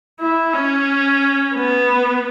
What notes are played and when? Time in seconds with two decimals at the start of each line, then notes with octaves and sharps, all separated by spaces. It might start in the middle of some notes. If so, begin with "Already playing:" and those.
0.20 E4
0.54 C#4
1.55 B3